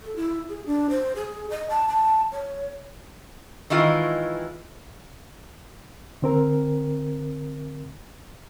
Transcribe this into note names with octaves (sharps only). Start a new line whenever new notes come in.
A4
E4
G#4
D4
C5
G#4
D#5
A5
A5
C#5
D#3 E3 G#3 E4 F4
D3 C4 A#4